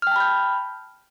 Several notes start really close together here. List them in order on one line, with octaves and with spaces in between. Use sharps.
F6 G5 A5 B5 G6